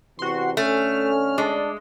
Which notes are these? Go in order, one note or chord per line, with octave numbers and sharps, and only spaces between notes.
E2 C3 E3 F#4 C6
D3 A3 C#4 F6
G#3 D4